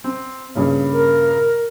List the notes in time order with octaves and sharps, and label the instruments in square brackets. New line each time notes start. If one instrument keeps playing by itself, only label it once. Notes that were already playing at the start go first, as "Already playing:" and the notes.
[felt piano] C4
G2 A#2 C#3
[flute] A#4